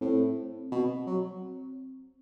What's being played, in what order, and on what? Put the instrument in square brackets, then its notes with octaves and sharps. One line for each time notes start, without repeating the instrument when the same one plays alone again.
[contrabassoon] A2 [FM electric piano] C4
[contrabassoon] B2
F#3